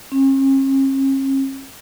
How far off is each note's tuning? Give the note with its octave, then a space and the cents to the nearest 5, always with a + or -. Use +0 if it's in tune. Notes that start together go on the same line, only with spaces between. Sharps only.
C#4 -45